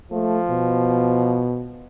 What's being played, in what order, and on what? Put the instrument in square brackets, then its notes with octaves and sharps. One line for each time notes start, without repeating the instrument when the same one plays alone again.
[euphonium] F3 [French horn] A3
[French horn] B2